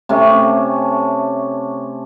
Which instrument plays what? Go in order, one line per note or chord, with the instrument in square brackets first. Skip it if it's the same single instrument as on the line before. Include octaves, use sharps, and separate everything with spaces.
[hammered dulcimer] C3 A3 C#4